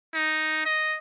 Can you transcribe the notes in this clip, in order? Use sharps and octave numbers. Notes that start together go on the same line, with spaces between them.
D#4
D#5